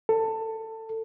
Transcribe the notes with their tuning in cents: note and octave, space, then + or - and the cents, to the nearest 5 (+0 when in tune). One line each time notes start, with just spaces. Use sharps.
A4 +20